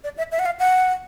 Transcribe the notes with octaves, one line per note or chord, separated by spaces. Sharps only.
D5
E5
E5
F#5
F5
F#5